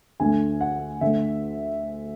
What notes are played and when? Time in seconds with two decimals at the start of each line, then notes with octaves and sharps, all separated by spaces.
0.20 D2 D3 A3 G#5
0.61 F#5
1.01 D2 D3 A3 E5